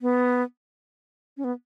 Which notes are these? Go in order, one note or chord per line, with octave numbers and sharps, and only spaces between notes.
B3
C#4
B3